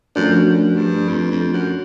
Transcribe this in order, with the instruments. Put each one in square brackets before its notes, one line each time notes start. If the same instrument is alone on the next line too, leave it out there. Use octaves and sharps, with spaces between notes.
[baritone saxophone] F#2 [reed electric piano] F3 A3 D4
[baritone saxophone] F#2
G2
F2
F2
F#2